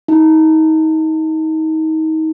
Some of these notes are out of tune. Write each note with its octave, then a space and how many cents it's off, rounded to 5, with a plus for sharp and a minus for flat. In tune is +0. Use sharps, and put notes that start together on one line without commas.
D#4 +30